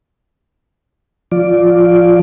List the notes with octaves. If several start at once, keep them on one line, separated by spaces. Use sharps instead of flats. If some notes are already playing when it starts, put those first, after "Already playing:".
F3 F4 D5